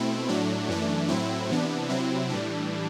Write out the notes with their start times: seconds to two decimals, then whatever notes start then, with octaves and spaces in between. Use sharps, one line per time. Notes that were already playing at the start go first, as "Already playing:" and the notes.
Already playing: B2 A3 C4 E4
0.28 A2 F#3 A3 D4
0.69 F#2 E3 A3 D4
1.08 A2 F#3 C4 E4
1.49 C3 E3 B3 D4
1.89 C3 F#3 C4 E4
2.30 A2 E3 G3 D4